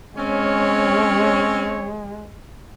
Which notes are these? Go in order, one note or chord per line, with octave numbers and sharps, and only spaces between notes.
G#3 C4 C#4 C#5